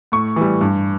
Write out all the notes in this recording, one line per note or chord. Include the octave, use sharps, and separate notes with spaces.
A2 C#6
E3 G3
G2